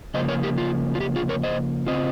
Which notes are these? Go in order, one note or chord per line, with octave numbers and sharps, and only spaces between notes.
C#3 F3 A#3 C5 D#5
A#4 C#5
G4 A#4
F4
F4
G4
F4 G#4
A#4 C#5
C5 D#5
C#3 G#3 C4 F4 C5 D#5